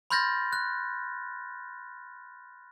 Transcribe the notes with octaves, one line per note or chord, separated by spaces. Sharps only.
B5 C6 F6 G6 A6 A#6
F#6